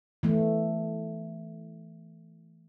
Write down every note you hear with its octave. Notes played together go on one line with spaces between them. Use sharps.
E3 A3